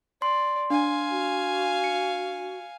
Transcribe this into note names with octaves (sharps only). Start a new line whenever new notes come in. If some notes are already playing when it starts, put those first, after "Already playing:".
D5 C6
D4 F5 G#5
F#4
C#7